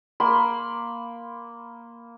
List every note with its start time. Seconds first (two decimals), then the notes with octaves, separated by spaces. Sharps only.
0.20 A#3 B5 C6